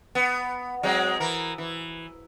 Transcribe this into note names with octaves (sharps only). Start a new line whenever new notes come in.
B3
F#3 G#3 C4
E3 A#4
E3